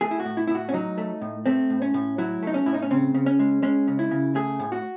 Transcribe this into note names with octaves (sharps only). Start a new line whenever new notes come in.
A3 G#4
E4
F#4
A2
E4
A2 E4
F#4
C#4
F#3 D#4
A3
A2
A3 C4
A2
C#4
A2
F#3 E4
A3 D#4
C#4
A2 E4
D#4
C#4
C#3 C4
C#3
C#4
G#3
G#3 C#4
C#3
E4
C#3
A3 G#4
A2
F#4